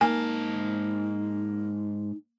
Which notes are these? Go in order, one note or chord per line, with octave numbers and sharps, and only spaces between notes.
G#2 A#3 D#4 G#5 A5